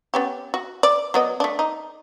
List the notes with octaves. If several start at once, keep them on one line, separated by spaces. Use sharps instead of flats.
B3 C#4 G4
F#4
D5
F#3 B3 D#5
A3 D4
D#4